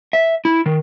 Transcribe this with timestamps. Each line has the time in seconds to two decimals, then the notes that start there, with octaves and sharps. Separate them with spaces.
0.13 E5
0.45 E4
0.66 D#3